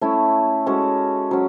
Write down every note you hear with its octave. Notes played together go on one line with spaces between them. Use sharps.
A3 C#4 E4
G#3 C#4 F#4 A4
F#3 C#4